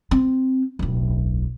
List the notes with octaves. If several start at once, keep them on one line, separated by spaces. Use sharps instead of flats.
C4
D1 B1